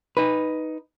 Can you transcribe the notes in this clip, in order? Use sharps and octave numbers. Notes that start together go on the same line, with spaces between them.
D#4 B4